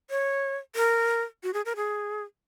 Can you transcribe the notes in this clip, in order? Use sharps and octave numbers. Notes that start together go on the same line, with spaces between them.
C#5
A#4
F#4
G#4
A#4
G#4